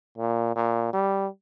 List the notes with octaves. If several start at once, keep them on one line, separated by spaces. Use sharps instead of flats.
A#2
A#2
G3